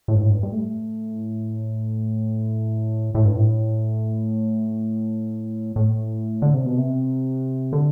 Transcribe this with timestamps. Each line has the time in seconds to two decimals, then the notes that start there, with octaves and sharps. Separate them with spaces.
0.08 A2
0.15 G2
0.22 A2
0.30 G2
0.43 G2
0.52 A2
3.15 A2
3.25 G2
3.36 A2
5.76 A2
6.42 D3
6.54 C3
6.65 B2
6.77 C3
7.73 D3